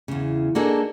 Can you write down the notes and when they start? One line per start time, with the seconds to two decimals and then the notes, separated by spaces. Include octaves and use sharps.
0.08 E2 C#3
0.55 A#3 D4 D#4 F#4 G#4 A4